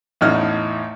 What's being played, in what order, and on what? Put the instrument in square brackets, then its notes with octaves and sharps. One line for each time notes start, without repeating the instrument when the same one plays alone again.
[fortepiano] A1 E2 A2 D#4 F6